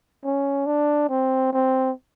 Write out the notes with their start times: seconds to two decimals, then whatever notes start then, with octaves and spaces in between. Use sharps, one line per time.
0.24 C#4
0.66 D4
1.09 C4
1.53 C4